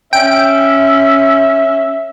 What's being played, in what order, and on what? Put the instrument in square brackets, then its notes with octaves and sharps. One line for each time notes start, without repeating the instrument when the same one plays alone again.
[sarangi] C#4 [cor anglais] E5 [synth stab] G5 D7